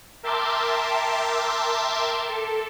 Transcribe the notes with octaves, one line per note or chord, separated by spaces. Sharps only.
A#4 E5 G5 A5 C6 D6
A4